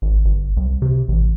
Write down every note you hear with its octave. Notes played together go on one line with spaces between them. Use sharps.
G#1
G1
C2
C3
A1